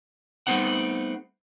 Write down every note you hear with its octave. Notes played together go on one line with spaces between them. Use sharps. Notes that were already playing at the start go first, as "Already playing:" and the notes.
G3 A3 B3 C4 D#4 F#5